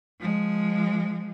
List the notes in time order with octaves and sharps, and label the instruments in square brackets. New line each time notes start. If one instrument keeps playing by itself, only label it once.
[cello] F3 G#3